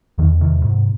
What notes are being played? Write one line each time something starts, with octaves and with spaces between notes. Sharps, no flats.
E2 D#3
C3 D#3
G#2